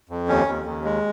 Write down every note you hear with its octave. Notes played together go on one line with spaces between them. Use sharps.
F2
D#2 C#4
D#2
D#2
G#3